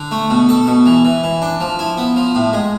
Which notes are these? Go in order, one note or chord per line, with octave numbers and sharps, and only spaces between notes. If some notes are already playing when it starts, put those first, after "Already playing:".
Already playing: D3
A3
B2
A4
B2
E3
E3
E3
D4
F3
E4
B3
F3
A2
G#3